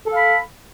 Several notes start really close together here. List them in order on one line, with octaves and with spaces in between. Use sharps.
A4 F5 B5